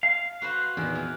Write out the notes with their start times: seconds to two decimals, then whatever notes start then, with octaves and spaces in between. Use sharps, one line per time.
0.03 F5
0.42 F#4 B4 C5
0.77 E2 A#2 D#3
0.95 E3